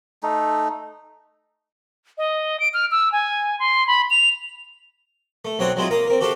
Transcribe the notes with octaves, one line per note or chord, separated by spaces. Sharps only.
A3 D#4
D#5
D7
F6
E6
G#5
C6
B5
F7
A3
B1 F#3 C4 C#5 F#5 C6
F#3 G#3 C4 E4 F4 G#4
A#3 F5 A#5 D#6
C4 A#4
F#4 G4 A4 C5 F5